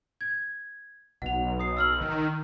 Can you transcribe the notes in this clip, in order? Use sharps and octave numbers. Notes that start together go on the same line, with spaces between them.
G#6
B1 F#5 F7
D#6 C7
E6 F6 F#7
D#3